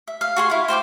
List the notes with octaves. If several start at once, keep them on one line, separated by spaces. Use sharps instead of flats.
E5
F5
F#4 G#4 C6
E4 F5
C5 G5 C6 D6